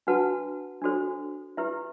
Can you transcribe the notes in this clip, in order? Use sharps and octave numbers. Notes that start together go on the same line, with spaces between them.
D4 F#4 B4 F#5 A5
D4 F#4 A4 C5
E4 G4 B4 E5